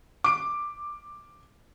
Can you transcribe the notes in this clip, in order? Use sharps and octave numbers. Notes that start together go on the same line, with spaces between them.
D6 D7